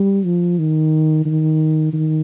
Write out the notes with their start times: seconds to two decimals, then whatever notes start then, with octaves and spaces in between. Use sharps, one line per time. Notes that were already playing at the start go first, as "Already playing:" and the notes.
Already playing: G3
0.25 F3
0.59 D#3
1.26 D#3
1.93 D#3